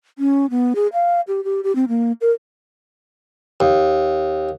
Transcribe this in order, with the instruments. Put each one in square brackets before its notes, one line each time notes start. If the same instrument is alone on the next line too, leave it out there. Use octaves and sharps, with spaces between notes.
[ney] C#4
B3
G#4
F5
G4
G4
G4
C4
A#3
A#4
[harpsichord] D#2